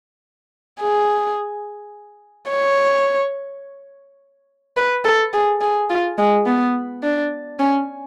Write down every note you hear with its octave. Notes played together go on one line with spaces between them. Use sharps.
G#4
C#5
B4
A4
G#4
G#4
F4
G#3
B3
D4
C#4